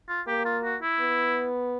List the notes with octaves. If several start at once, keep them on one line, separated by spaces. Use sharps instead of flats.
F4
A#3 G4
F4
F#4
E4
B3